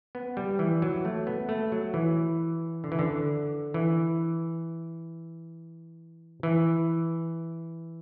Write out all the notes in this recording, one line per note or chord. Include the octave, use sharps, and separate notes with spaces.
B3
G3
E3
F#3
A3
B3
A3
F#3
E3
D3
E3
D3
E3
E3